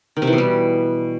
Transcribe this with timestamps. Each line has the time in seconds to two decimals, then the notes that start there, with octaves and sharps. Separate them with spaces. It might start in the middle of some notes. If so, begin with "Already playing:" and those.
0.16 D#3
0.22 C3
0.27 E3
0.33 B2
0.38 G3